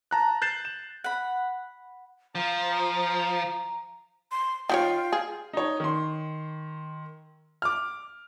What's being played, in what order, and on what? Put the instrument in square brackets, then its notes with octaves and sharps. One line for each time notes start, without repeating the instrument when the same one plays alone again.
[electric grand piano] A5 A#5 F#6
F#6 G6 A6 C7 E7
E7
[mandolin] F#5 B5
[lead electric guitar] F3 [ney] A#5
[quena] C6
[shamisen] D#3 F#4 C#5 [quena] F4 [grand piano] G5
[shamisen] G#4
[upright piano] D#4 C#5
D#3 C6
D6 F6